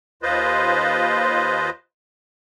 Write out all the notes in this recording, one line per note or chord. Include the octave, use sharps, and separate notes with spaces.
D#2 F4 B4 C5 D#5